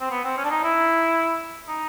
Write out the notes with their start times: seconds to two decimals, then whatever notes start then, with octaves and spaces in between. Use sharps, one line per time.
0.01 C4
0.11 B3
0.25 C4
0.37 C#4
0.44 D4
0.51 D#4
0.63 E4
1.68 D#4